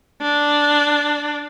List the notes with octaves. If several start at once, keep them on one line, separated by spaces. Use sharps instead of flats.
D4